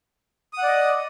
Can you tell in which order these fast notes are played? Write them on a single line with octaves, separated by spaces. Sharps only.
D#6 F#5 D5 D#5